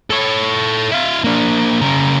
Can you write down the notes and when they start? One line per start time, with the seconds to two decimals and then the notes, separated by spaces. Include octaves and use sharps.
0.11 A4 C#5
0.91 E4 F5
1.24 A#3 D4
1.81 C#3 A#4